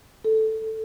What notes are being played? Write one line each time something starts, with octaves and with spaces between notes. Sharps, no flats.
A4